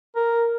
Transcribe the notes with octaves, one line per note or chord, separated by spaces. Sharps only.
A#4